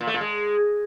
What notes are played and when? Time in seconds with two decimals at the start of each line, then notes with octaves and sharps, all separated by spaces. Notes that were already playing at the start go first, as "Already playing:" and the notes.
0.01 A#2
0.07 A3
0.14 A#2
0.21 G#3